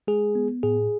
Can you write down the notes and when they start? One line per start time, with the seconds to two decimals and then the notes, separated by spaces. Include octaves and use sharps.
0.07 G#3 G#4
0.35 B3
0.63 A2 G#4